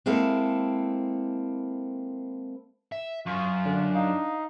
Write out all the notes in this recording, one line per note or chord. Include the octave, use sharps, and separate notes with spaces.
G#3 A#3 C4 E4 A4
E5
F#2 F4 C#6
D3 D4
D#4 F5